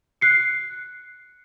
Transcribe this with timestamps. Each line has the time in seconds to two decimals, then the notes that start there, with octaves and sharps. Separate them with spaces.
0.21 F#6 C7 C#7